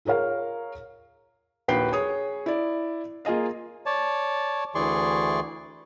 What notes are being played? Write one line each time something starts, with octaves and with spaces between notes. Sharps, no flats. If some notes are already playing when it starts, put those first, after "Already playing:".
F4 G#4 A#4 C#5 F5
A#1 D#2 F#4 B4 G5 C7
G#4 C#5 D#6
E4 D5
A#3 F4 G#4 D#5 F5
C#5 D5 A5
D2 E3 G#4 D5 C6 C#6